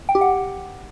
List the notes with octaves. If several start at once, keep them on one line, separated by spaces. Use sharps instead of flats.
G5
G4
F#5